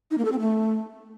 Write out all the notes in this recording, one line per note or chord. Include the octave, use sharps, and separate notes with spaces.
D#4
A#3
A4
C4
A3